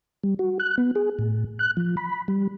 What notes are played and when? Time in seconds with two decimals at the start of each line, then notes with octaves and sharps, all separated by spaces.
0.24 G3
0.39 F#4
0.60 F#6
0.78 B3
0.95 G#4
1.19 A2
1.59 F#6
1.77 F3
1.97 B5
2.28 G3